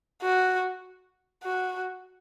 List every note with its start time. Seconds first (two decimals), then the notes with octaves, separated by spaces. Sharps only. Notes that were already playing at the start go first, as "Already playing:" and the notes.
0.22 F#4
1.44 F#4